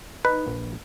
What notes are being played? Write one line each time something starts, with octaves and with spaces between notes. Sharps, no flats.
D#4 B4
A#1